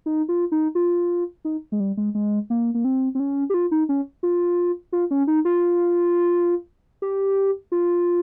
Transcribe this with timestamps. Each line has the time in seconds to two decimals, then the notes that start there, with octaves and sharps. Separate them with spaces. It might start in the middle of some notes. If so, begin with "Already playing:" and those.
0.06 D#4
0.29 F4
0.52 D#4
0.75 F4
1.45 D#4
1.72 G#3
1.80 G3
1.97 G#3
2.15 G#3
2.50 A#3
2.74 A#3
2.84 C4
3.15 C4
3.20 C#4
3.50 G4
3.54 F4
3.71 D#4
3.89 C#4
4.23 F4
4.92 F4
5.11 C#4
5.27 D#4
5.45 F4
7.02 G4
7.72 F4